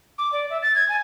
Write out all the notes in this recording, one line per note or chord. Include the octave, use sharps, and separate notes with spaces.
D6
D5
E5
A6
G#6
G#5